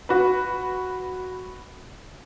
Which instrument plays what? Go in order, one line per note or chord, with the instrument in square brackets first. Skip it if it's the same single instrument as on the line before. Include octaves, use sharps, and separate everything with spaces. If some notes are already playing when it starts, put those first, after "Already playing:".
[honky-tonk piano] F#4 B4